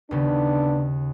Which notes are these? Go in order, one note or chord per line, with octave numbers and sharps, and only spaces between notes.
D#2 C#3 B3 C#4 D4